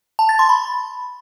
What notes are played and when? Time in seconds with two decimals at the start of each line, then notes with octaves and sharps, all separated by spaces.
0.19 A5
0.29 A6
0.39 C6
0.49 B5